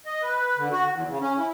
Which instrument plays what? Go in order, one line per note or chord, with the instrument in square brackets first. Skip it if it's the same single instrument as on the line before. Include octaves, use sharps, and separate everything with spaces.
[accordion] D#5
B4
D3
F#4
E2
C#3
C#4
E4